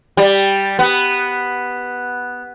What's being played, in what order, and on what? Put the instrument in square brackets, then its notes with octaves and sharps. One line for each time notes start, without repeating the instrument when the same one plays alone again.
[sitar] G3
B3